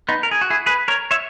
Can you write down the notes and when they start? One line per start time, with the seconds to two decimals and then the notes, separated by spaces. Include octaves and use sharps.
0.09 B3 D#4
0.23 A#4
0.31 G#4
0.41 F#4
0.50 E4 G#4
0.66 G#4 B4
0.88 A#4 C#5
1.11 C#5 E5